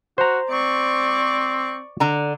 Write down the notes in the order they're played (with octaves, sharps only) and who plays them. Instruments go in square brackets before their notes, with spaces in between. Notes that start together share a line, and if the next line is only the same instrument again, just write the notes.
[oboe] F#4 [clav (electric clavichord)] C5 A#5
[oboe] C4 [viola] D5 C#6
[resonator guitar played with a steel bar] D3 A#5